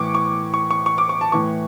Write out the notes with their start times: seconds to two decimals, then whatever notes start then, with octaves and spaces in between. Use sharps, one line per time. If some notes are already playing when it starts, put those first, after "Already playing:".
Already playing: A2 E3 C#6 D6
0.15 C#6
0.54 C#6
0.71 C#6
0.86 C#6
0.98 D6
1.09 C#6
1.21 A5
1.32 A2 E3 C#6